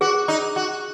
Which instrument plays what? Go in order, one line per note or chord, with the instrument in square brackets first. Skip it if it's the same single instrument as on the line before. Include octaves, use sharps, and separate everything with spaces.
[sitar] F#4 [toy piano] G#4
[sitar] D#4
F#4